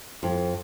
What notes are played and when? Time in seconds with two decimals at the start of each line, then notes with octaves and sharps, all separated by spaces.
0.23 F2